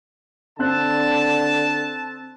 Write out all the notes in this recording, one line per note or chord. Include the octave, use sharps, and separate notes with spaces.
D3 C4 A5 F#6